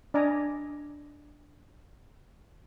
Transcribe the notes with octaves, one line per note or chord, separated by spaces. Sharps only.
D4 D5 D#5 G#5 A#5